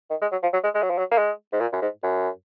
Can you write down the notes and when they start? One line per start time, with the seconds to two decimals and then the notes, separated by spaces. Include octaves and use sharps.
0.10 D#3
0.21 G#3
0.32 F#3
0.43 F3
0.53 F#3
0.64 G#3
0.75 G#3
0.82 F#3
0.90 F3
0.98 F#3
1.11 A#3
1.18 G#3
1.52 G#2
1.60 A#2
1.72 F#2
1.81 G#2
2.03 F#2